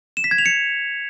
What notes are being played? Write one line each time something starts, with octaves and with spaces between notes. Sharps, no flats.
E7
B6
G#6
F7
C#7